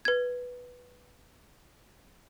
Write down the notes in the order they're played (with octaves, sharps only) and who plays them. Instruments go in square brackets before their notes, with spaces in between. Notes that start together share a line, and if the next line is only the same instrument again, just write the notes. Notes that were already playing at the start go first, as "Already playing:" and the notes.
[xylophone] B4 G#6